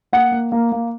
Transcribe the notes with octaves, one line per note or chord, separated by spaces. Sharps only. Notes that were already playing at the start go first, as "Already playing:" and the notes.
A#3 F#5
A#3
A#3
A#3